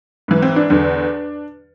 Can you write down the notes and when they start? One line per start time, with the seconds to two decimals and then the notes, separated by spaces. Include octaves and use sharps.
0.28 G#2 E3
0.42 C4
0.56 D4
0.70 E2 D3